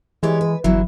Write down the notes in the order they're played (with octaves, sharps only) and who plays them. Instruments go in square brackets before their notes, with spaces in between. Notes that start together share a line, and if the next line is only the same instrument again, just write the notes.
[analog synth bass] E3 [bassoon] G#3 [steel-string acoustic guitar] G4 C#5 D5
[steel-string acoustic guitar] B4
[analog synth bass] G1 [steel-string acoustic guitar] E2 E3 F#3 [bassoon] E4